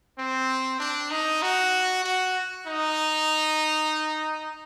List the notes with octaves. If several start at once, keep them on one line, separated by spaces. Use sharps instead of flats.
C4
D4
D#4
F#4
F#4
D#4